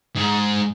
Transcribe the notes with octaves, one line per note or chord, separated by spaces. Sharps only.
G#2